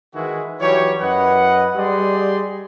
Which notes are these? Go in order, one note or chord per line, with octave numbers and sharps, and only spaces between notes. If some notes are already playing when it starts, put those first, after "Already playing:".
D#3 E3 G#3 E4 F#4 G#4
E3 F#3 G3 G4 C#5
F#2 B4 D#5 F#5
G3 G4 G#4 D5 D#5 C6